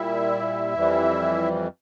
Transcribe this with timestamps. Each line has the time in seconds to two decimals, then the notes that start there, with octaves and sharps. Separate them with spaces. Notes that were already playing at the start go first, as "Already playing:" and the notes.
Already playing: A#2 G3 E4 E5
0.74 F2 E3 G3